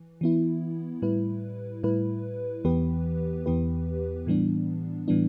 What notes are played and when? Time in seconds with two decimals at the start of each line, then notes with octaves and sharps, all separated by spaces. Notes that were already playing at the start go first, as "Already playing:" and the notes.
Already playing: E3
0.21 E3 B3 E4
1.02 A2 G3 E4 B4
1.83 A2 G3 E4 B4
2.65 E2 E3 B3 G4 B4
3.46 E2 E3 B3 G4 B4
4.26 A2 E3 G3 B3 D4
5.08 A2 E3 G3 B3 D4